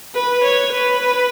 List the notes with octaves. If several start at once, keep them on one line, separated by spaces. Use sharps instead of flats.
B4
C#5
B4